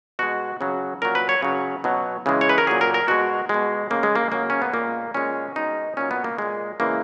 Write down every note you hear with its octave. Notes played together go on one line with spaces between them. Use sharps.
B2 G#3 F#4
C#3 F#3
A#2 F#3 A#4
B4
C#5
C#3 F#3
B2 F#3
C#3 E3 G#3
C#5
B4
A#4
A#2 F#3 G#4
A#4
A#4
B2 G#3 F#4
B2 G#3
C#3 G#3 A#3
G#3
A#3
C#3 F#3 A#3
C#4
B3
A#2 G#3 A#3
A#2 G#3 C#4
B2 G#3 D#4
A#2 F#3 C#4
B3
A#3
A#2 G#3
C#3 E3 G#3 A#3